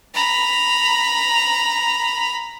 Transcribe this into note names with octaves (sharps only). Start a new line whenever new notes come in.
A#5 B5